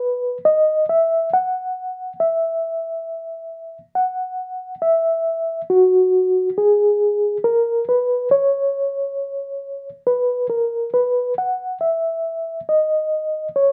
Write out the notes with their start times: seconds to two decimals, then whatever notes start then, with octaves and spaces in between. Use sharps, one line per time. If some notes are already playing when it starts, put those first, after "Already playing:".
Already playing: B4
0.45 D#5
0.89 E5
1.33 F#5
2.20 E5
3.95 F#5
4.82 E5
5.70 F#4
6.58 G#4
7.44 A#4
7.89 B4
8.31 C#5
10.07 B4
10.50 A#4
10.94 B4
11.38 F#5
11.81 E5
12.69 D#5
13.56 C#5